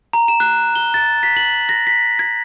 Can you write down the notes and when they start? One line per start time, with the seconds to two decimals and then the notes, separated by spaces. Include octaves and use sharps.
0.13 A#5
0.28 E7
0.40 F#6
0.75 G7
0.94 A6
1.23 B6
1.37 F#7
1.69 A#6
1.87 B6
2.19 G#6